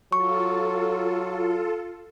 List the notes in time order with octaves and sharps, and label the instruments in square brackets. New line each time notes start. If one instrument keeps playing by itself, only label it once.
[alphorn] F#3 [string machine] F4 A4 [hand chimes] C#6